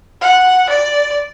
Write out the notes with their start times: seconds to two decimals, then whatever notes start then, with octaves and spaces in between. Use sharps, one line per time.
0.21 F#5
0.69 D5